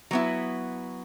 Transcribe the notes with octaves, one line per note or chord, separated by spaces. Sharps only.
F#3 B3 E4